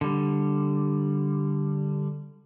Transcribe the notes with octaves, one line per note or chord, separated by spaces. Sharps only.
D3 G3